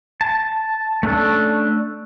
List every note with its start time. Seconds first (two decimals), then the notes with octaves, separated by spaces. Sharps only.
0.21 A5
1.03 A3 C#4 D4 A4